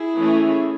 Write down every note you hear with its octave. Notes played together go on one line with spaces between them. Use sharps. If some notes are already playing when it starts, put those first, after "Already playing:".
Already playing: E4 G#4
E3 A3 C#4